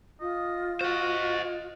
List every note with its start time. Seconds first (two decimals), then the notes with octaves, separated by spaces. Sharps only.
0.21 F4 D#5
0.81 F#4 C5 D#5